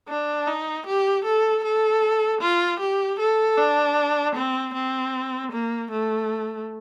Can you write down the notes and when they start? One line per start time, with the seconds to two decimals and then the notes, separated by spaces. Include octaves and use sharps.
0.09 D4
0.47 D#4
0.87 G4
1.25 A4
1.64 A4
2.42 F4
2.80 G4
3.20 A4
3.58 D4
4.36 C4
4.74 C4
5.53 A#3
5.91 A3